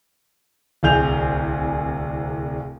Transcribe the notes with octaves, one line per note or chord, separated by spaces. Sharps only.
D1 C2 G#4 G6 F7